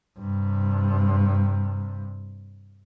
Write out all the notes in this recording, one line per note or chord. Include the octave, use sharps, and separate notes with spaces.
G2 C3